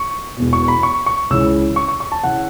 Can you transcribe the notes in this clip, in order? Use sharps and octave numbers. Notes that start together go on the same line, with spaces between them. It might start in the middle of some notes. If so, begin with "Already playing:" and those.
Already playing: C#6
E1 E2 B2
C#6
B5
C#6
C#6
C#2 C#3 E3 E6
C#6
C#6
C#6
A5
C#3 E3 F#5